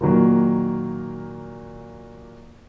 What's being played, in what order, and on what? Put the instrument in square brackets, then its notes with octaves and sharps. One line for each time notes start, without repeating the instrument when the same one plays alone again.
[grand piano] A#2 D#3 F#3 A#3